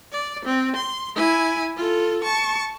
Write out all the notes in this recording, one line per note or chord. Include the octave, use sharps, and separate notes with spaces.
D5
C4
C6
E4 G#5
F4 A4
A5 C#6